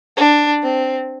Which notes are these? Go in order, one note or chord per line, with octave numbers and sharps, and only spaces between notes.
D4
C4